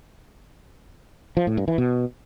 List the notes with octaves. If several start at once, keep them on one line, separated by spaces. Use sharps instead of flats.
F3
A2
G2
E3
B2